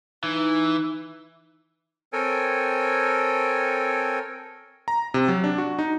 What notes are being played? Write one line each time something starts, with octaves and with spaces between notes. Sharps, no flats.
E3 D#4
C4 A4 A#4 C#5 G5 G#5
A#5
C3
F#3
D4
F#4
D#4